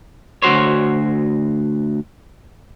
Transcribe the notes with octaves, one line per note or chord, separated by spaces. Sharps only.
D2 A#2 F#4 C5 C#5